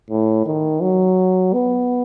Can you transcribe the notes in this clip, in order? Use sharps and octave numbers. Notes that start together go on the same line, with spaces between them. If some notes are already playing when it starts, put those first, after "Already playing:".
A2
D#3
F#3
B3